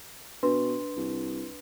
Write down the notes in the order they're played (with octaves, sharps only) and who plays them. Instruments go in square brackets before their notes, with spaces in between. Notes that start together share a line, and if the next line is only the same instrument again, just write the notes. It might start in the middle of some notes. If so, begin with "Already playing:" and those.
[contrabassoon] B2 [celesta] D4 B4 C6
[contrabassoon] C2